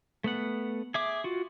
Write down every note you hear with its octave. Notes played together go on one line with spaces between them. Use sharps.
A3 B3 F#5
G#4 E5 D6
F4 F#4